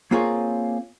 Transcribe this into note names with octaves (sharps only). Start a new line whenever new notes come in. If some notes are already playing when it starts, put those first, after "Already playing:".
A#3 C4 F4 G#4 A#4 C#5